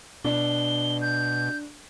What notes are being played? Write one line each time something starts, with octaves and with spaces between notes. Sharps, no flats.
B2 D4 G7
G6